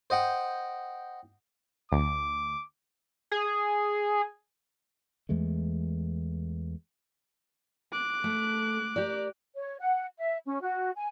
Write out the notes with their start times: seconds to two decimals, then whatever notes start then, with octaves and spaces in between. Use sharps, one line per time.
0.10 C5 D#5 F#5 G5
1.92 D2 D6
3.31 G#4
5.29 E2 E3 G#3 A3
7.92 D6 F#6
8.24 A3
8.96 G4 A#4 D5
9.56 C#5
9.79 F#5
10.18 E5
10.46 C#4
10.62 F#4
10.96 G#5